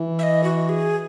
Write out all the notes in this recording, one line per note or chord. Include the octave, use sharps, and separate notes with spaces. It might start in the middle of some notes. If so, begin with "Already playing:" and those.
Already playing: E3
E5
D#5
F#4
G#4